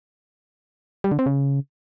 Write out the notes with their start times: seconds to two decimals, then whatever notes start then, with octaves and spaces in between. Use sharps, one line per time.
1.04 G3
1.12 D3
1.19 C4
1.26 C#3